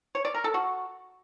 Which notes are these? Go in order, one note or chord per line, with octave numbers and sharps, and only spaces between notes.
C#5
D5
A#4
A4
F#4